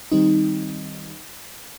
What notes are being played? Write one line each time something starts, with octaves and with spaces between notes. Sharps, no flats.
D#3 G3 C4 D#4